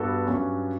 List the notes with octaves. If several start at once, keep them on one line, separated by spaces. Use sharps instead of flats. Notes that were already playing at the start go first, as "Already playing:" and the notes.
Already playing: G2 B3 F#4 A4
G2 F#3 C#4